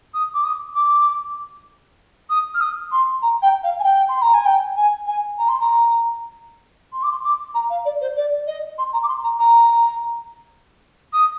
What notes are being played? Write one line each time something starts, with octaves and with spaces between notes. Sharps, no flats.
D#6
D6
D#6
D6
D#6
F6
D#6
C6
A#5
G5
F5
G#5
G5
C6
A#5
G#5
G5
G#5
G#5
A#5
C6
A#5
C6
D6
C6
D6
A#5
F5
D5
C5
D5
D#5
C6
A#5
D6
C6
A#5
A#5
D#6